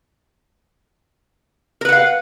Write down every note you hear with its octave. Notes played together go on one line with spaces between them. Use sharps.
A#4 B4 F5 F#5